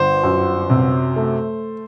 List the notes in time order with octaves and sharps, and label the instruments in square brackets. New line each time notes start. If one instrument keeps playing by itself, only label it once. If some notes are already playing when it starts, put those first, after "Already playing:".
Already playing: [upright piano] G1 [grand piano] C5
[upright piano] F#2
C3
A3